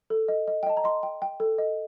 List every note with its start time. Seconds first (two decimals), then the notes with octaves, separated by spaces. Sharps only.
0.10 A4
0.28 D#5
0.48 D#5
0.63 G5
0.66 D#5 A5
0.77 A#5
0.84 D#5 C6
1.03 G5
1.22 G5
1.40 A4
1.58 D#5